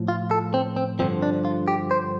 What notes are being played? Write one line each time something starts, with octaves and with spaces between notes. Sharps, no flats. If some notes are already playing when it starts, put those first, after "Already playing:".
Already playing: A2 F3
F4
A4
C4
C4
G2 D3 F3 C4
D4
F4
G4
C5